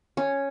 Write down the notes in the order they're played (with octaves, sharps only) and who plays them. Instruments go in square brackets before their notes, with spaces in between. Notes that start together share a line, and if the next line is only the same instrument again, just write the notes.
[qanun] C#4